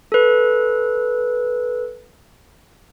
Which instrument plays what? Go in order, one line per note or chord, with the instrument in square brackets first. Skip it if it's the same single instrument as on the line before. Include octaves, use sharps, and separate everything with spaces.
[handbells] A4 B4